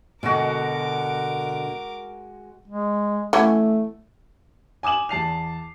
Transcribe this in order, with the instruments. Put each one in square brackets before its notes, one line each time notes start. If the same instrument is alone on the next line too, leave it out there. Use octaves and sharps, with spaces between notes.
[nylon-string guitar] B2 D3 [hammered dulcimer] G#3 F#4 [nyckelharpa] A#4 D6
[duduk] G#3
[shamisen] E3 B3 C#4 [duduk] A3
[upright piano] G#5 D6 D#6 E7 F#7
E2 A5 C7 F7